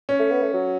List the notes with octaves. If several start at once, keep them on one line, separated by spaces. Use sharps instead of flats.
C#4
A3
B3
A3
F#3